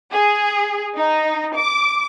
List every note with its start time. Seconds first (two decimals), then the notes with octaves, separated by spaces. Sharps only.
0.11 G#4
0.96 D#4
1.56 D6